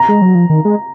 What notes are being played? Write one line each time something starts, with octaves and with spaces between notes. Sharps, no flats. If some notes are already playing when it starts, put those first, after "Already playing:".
Already playing: A#5
G#3
F#3
F3
D#3
G#3